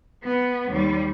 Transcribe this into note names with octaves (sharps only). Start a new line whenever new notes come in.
B3
D#2 G3